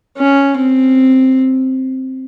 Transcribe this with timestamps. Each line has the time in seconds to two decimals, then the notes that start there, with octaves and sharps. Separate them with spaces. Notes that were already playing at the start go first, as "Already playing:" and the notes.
0.17 C#4
0.57 C4